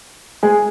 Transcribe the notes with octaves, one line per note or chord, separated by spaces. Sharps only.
G#3 G#4